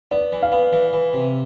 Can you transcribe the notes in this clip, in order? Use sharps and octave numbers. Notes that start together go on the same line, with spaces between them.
B3 D5
E3
F5
B3
E3
E3
C3